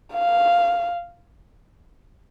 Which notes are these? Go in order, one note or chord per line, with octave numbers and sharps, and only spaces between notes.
F5